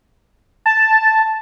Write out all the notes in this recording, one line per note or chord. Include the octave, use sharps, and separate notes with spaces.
A5